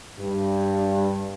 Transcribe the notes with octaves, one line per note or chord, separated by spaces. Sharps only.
G2